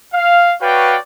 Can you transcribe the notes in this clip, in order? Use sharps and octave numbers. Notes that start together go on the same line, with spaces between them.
F5
F#4 B4 C#5 D5 F5 G5